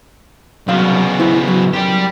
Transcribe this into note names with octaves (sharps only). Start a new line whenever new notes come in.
C2 C#3 F#3 B3 F5
E4 C5
F#3
F#2 G4 D5